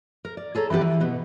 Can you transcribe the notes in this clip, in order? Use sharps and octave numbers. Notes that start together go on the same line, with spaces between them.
A#4
D5
G#4 A4 C#5 A#5
E3 G3 B3 G4 B4
E3
B2 B3